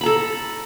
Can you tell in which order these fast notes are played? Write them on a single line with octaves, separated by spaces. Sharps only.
B5 A#5 A4